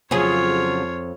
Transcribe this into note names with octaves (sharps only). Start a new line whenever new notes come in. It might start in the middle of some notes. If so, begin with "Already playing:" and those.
F2 C#3 F3 F#3 F4 G#4 C#5